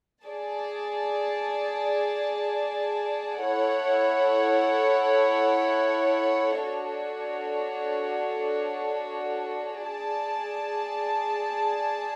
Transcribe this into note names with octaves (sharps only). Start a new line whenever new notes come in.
G#4 D5 A5
E4 A4 C#5 F#5
D4 F#4 A4 C#5
G#4 D5 A5